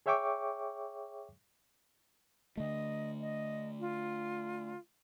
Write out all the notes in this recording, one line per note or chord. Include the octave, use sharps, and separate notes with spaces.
G#4 C#5 E5 G5 C#6 D6
D3 A3 D#5
D#5
F4